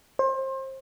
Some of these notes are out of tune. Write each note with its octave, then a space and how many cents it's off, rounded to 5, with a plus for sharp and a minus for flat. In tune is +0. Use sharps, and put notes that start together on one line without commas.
C5 +30